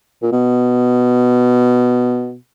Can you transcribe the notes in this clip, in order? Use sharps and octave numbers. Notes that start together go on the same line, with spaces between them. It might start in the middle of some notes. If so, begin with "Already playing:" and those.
A#2
B2